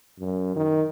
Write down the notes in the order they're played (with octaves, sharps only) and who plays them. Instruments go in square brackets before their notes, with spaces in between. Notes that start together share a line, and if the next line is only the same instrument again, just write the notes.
[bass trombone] F#2
D#3